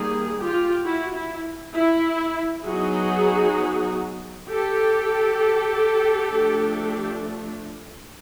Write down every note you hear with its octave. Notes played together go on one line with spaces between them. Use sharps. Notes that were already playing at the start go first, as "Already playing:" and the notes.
Already playing: D#3 G3 A#3 G#4
F4 G4
E4 F#4
E4
E4
F#3 B3 D#4 F#4 G#4
G4 A4
F3 A3 D4